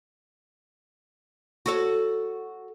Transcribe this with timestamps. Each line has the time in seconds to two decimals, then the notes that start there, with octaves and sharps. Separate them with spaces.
1.66 F#4 A4 C#5